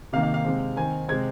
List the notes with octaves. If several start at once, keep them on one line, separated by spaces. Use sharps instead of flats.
C3 D#3 A#3 F5
F5
F5
C3 G#3 C4
D#3 C4 G#5
C3 G#3 C4 G#6